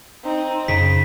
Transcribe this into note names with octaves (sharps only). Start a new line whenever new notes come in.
C4 D#4
F#2 C#3 B6